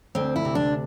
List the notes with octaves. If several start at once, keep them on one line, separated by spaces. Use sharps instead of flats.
D2 C4
E4
C3
D4